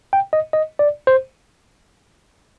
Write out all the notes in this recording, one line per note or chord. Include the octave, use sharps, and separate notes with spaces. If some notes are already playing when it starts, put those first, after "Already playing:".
G5
D#5
D#5
D5
C5